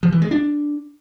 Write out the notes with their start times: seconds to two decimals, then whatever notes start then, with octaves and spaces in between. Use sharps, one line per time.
0.03 F3
0.12 E3
0.22 G#3
0.31 D4